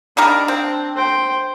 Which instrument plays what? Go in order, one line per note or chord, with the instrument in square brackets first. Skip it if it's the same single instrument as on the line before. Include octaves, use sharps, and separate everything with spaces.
[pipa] D#3 G3 A#4 [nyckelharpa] D4
[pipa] C4
[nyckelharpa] C5 G5